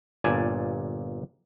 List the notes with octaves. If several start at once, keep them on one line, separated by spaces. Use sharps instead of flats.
G1 A#2 D5 G#5 A5